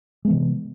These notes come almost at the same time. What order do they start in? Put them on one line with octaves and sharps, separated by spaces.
G#3 B3 E3 C3